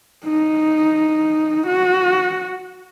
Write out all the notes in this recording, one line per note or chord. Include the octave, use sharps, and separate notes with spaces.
D#4
F#4